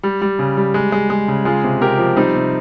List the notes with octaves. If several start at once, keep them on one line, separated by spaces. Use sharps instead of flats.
G3
G3
C#3
G3
G#3
G#3
G#3
C#3
G#3 F4 G#4
C3
C3 G4 A#4
F3
G3 C4 D#4
C3